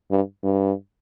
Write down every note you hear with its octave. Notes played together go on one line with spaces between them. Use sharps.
G2
G2